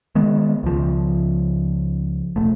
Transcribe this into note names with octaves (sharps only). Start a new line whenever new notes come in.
D#3 G#3 B3
C#2 F3
E1 A3